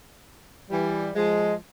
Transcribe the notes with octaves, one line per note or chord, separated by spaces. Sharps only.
E3 G3
F3 G#3